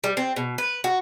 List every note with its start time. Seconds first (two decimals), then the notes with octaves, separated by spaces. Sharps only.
0.04 G3
0.17 C4
0.36 B2
0.58 B4
0.84 F#4